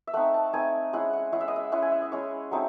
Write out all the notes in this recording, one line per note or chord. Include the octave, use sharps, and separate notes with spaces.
E5
A3 C4 D#4 F#5
A5
A3 C4 D#4 G#5
G#3 C#4 E4 F#5
F#5
G#3 C#4 E4 F#5
E5
D#5
E5
G#3 C#4 E4 F#5
G#5
E5
D#5
G#3 C#4 E4 C#5
F#3 A3 C4 D#4